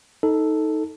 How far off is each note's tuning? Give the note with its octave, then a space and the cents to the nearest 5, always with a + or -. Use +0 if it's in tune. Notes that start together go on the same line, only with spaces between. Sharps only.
D#4 +15 A4 +0